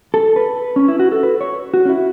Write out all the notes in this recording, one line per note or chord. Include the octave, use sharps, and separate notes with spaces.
A4
B4
C#4
E4
F#4
A4
B4
C#5
F#4
C#4
E4